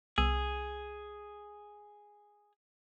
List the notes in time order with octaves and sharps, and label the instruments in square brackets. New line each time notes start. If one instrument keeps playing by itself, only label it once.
[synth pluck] C2 B3 E6 [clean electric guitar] G#4